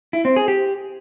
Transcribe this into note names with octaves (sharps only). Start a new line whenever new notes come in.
E4
C4
G#4
G4